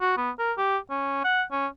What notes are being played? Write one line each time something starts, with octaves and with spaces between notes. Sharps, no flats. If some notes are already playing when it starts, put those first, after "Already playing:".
F#4
B3
A#4
G4
C#4
F#5
C#4